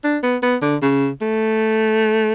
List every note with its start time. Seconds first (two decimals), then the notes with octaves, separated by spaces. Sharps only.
0.04 D4
0.23 B3
0.42 B3
0.62 D3
0.82 C#3
1.21 A3